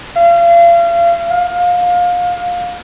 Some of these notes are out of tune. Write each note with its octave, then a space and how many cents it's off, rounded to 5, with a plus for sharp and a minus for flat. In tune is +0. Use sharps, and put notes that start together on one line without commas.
F5 -35
F5 +25